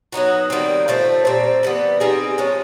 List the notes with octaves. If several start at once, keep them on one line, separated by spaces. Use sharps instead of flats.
F#3 B3 D#4 F#4
D#3 G3 C4
F3 A3 C4
A#2 G3 C4
E3 G3 B3
G3 C4 D#4 G#4
F3 G#3 C#4